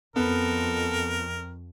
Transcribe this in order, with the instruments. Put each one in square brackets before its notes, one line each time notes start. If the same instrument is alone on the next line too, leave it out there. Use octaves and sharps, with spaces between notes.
[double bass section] F2 [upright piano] B3 [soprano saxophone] A4 [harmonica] A#4